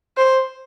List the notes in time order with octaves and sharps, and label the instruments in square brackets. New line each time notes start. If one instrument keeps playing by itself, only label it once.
[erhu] C5